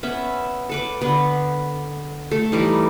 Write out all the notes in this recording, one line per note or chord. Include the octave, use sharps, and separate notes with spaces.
B3 C#4 E5
A4 B4 D6
D3 B3 B4
A3 A4
E3 G3 D#4